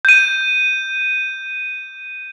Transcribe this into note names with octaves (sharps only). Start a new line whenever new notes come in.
G6 D#7